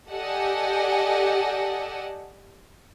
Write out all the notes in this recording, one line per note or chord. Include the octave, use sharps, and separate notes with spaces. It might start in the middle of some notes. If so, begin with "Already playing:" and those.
G4 A4 D5 D#5 F#5 G#5